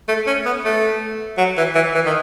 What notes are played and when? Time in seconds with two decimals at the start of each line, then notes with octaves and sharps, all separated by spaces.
0.08 A3
0.27 C#4
0.45 B3
0.65 A3
1.38 F#3
1.57 E3
1.75 E3
1.94 E3
2.06 D#3